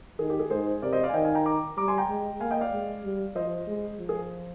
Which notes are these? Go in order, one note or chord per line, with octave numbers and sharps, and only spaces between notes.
D#3 G#4
G4
G#4
G#2 G#4 C5
C3 A#4 D5
C5 D#5
D5 F5
G#5
D#3 D#5 G5
F5 G#5
G5 A#5
A#5 D6
G3 A#5 D6
G#5 C6
G5 A#5
G#3
A#3 F5 G#5
D#5 G5
D5 F5
G#3
G3
F3 C5 D#5
G#3
F3
G#4